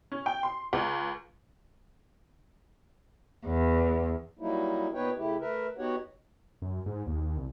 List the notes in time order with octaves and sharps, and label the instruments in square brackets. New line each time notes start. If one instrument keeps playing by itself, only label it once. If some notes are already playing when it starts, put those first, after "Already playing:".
[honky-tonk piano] C#4
G5
C6
C#2
[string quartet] E2
[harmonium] F#3 G3 A#3 D#4 E4
A#2 B3 D#4 B4 C#5 G5
C#3 A3 E4 G4
A3 A#4 B4 E5
B3 D#4 F#4 G4 C#5 F#5
[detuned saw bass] F#2
G#2
D#2
D#2
C2